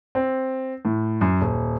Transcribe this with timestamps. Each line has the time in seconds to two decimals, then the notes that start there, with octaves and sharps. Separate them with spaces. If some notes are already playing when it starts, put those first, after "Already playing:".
0.15 C4
0.85 A2
1.21 F#2
1.41 D#1